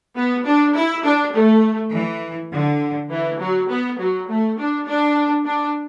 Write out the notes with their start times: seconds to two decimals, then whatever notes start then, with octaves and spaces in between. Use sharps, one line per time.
0.15 B3
0.45 D4
0.75 E4
1.04 D4
1.33 A3
1.92 E3
2.51 D3
3.10 E3
3.39 F#3
3.69 B3
3.98 F#3
4.28 A3
4.57 D4
4.87 D4
5.46 D4